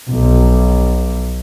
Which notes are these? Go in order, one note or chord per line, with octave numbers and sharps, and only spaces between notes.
B1